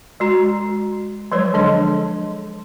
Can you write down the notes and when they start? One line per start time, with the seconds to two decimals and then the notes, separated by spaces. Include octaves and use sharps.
0.20 G#3 F#4 A#5
1.32 F3 F#3 G#3 B4 C#5
1.54 D3 D4 A4 D#5 C6